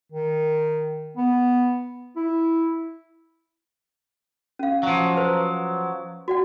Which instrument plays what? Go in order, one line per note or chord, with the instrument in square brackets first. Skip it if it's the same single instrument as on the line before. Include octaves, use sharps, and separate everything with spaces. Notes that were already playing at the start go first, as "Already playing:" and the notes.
[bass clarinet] D#3
B3
E4
[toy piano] C#4 F5
[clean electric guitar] F3 F#3
[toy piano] B4 C5
F#4 D5 F#5